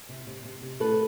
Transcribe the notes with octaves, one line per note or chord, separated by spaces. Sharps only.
C3
C3
C3
C3
A2 A4 B4